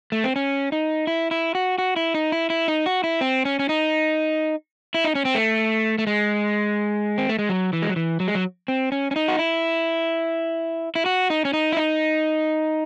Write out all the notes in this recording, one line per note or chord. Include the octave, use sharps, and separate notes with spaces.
A3
C4
C#4
D#4
E4
E4
F#4
F#4
E4
D#4
E4
E4
D#4
F#4
E4
C4
C#4
C#4
D#4
E4
D#4
C#4
C4
A3
A3
G#3
C4
A3
G#3
F#3
E3
G#3
F#3
E3
F#3
G#3
F#3
C4
C#4
C#4
D#4
F#4
E4
E4
F#4
D#4
C#4
D#4
E4
D#4